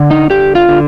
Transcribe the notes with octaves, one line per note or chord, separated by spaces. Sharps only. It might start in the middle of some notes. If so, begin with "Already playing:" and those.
Already playing: D3
D#4
D3 G4
F4
D3